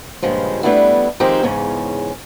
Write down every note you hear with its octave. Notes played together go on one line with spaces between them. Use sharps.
G2 A#2 C#3 F3 G#3
G3 A3 B3 D4 E4 F#4
D#3 F3 G#3 C4 D#4 G4
E2 G#2 C#3 C#4